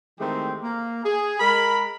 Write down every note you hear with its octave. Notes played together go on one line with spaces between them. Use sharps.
D#3 E3 G#3 A3 C4 G4
A#3
G#4
G#3 A#4 B5